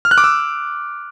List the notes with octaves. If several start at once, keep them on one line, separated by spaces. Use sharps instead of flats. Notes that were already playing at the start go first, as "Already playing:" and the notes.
F6
F#6
D6
E6